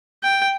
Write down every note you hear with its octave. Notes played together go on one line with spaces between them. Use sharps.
G5